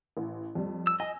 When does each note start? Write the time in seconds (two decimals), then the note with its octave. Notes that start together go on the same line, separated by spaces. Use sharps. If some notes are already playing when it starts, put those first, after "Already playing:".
0.17 A1
0.55 F2 G3
0.87 E6
1.00 D#5 G#5